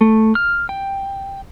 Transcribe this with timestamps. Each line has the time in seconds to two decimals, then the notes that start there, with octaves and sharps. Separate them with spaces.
0.01 A3
0.35 F6
0.69 G5